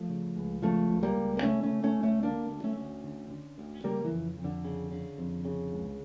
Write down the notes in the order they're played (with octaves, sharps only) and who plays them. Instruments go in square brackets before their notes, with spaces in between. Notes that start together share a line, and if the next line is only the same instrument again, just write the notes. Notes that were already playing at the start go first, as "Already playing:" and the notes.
Already playing: [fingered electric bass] F3 A3
C#3
C#2
C#3 F3 A3
C#2
G3 A#3
C#2
A#3
C#3 A3 C#4
A3 C#4
C#3
A3 C#4
C#2
A3 C#4
D3 A#3 D4
D2
A3 C#4
D2
D3
D3
D2
C#3 G3 A#3
E3
F2
F2
D3
C#3
C#3
F2
C#3
C#2